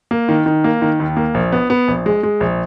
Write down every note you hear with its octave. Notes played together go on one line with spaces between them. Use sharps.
A#3
D#3
D#3
A#3
D#3
D#2
A#3
A#1
B3
B3
A#1
G#3
G#3
A#1